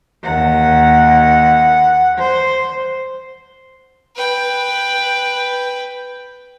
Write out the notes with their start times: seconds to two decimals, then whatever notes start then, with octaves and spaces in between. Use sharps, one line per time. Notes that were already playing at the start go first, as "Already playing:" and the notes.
0.23 D#2 F#5
2.18 C5
4.16 B4 G5